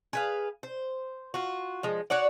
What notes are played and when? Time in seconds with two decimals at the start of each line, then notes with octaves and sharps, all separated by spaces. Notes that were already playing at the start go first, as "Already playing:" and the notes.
0.13 G#4 B4 F5
0.63 C5
1.34 F4 F#4
1.83 F3 G#3
2.10 F#4 C#5 D5 F#5